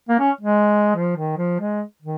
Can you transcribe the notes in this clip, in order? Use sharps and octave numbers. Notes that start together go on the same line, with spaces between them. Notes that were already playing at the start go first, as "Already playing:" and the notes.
A#3
C#4
G#3
F3
D#3
F3
G#3
D#3